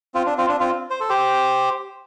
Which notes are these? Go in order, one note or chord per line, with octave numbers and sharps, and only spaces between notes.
C4 F4
D4
C4 F4
D4
C4 F4
C5
A4
G4 C5